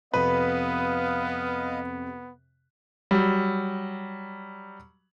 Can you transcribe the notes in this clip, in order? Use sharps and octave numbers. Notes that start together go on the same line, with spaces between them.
F2 C3 B3 B4 D#5 F5
F#3 G3